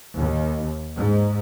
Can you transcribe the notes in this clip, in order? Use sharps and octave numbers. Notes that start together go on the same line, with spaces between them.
D#2
G#2